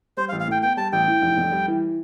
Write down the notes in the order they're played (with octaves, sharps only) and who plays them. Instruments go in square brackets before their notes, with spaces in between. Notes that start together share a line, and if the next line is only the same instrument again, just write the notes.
[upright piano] G3 [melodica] C5
[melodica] F5
[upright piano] A1
[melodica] F5
[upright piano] A2 [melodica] G5
[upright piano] B3 [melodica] G5
[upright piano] G3 [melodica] A5
[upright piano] A1 [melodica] G5
[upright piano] E3
F1
F2
G3
E3